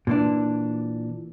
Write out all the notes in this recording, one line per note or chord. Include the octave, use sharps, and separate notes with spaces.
A#2 E3 D4